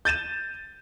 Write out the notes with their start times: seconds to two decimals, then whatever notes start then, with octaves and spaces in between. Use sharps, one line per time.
0.05 G6 A6 D#7 E7